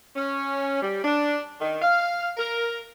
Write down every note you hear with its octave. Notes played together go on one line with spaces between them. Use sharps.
C#4
G3
D4
D#3
F5
A#4